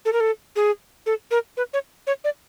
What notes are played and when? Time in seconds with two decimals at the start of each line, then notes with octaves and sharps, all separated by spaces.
0.05 A4
0.13 A#4
0.20 A4
0.56 G#4
1.06 A4
1.31 A#4
1.57 B4
1.73 C#5
2.07 C#5
2.24 D5